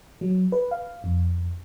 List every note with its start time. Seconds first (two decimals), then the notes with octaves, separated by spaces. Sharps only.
0.21 F#3
0.52 B4
0.71 F5
1.04 F2